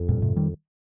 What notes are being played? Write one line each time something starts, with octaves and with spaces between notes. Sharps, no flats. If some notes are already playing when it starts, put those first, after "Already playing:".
Already playing: F2
G2 A#2
G#2 C3
D#3 G3